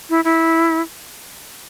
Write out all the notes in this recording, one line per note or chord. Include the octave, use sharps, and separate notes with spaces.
E4
E4